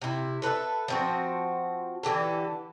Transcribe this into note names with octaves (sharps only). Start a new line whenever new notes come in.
C3 E4
A4 B4 D5 E5
F3 C4 F#4
D3 E3 G4 A4